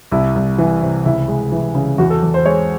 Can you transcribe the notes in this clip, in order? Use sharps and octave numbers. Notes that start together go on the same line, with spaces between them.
C2 E4
C2
E3
C3
C#2 E4
G#3
E3
C#3
E2 F#4
A4
E2
C5
G#3 C#5